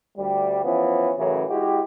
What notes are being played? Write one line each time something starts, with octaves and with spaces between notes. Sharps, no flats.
D2 G3
E3 F3 B3 C#4 E4
F#2 A2 C#3 E3
G#3 E4 F#4 G4